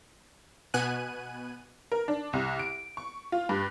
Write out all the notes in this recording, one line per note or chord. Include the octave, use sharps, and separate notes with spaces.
B2 B3 G#5 F#6 D#7
A#4
D4
C2
D7
C#6
F4
G2